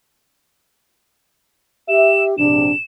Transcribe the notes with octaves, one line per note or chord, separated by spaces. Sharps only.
G4 E5 E7
A#1 G#2 C3 D4 E7